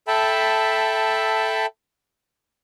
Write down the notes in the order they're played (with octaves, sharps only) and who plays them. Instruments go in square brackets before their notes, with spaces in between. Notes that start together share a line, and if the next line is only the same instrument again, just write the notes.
[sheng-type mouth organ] A4 E5 G5 A5 B5